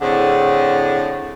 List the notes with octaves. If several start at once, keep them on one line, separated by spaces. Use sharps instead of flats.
A2 D3 C4 G#4